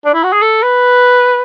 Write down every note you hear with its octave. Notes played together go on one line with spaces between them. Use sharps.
D4
E4
F#4
G#4
A4
B4